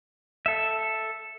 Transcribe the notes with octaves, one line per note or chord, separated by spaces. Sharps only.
A4 E5